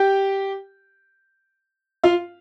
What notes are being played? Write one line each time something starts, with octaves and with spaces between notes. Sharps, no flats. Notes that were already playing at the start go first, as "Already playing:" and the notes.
Already playing: G4 G5
F4 F5